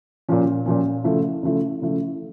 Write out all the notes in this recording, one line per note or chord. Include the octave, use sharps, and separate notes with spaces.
A#2 F3 C#4
A#2 F3 C#4
C#3 F3 A3 E4
C#3 F3 A3 E4
C#3 F3 A3 E4